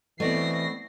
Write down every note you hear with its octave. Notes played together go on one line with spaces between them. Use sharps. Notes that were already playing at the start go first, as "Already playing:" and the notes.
B2 E3 A3 B3 C4 D5 A#6 C7